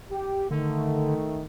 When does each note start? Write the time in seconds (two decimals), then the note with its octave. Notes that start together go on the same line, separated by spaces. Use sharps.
0.10 G4
0.51 D3 D#3 A3